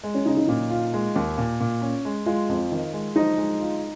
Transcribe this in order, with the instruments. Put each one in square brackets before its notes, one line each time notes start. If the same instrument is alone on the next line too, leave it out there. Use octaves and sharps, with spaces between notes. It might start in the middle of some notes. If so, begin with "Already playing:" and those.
[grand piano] G#3
[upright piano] C#4
[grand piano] C#3 [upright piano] D#4
[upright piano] D#4
[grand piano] A#2 [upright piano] D#4
[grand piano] F4
G#3
D#2
A#2
A#2
C#4
G#3
[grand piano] G#3 [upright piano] F4
[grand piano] F2
D#3
G#3
[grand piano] F3 [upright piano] D#4
[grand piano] G#3
F4